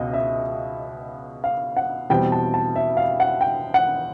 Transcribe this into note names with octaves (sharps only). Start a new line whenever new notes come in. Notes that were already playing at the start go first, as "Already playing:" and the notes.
Already playing: C#2 B2 D#5
E5
F5
F#5
E2 B2 G3 C4 G5
A5
A5
E5
F5
F#5
G5
F#5